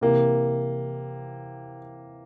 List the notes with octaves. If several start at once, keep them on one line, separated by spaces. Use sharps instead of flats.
C3 E3 A#3